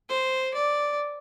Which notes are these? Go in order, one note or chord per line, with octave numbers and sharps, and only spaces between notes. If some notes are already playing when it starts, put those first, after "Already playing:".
C5
D5